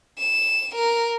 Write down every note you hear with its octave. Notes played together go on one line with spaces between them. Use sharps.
E7
A#4